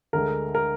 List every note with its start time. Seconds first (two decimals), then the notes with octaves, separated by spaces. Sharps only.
0.13 D2 D3 G#3 A#4
0.55 A#4